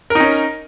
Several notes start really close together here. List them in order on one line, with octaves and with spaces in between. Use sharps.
A#4 D#4 C#4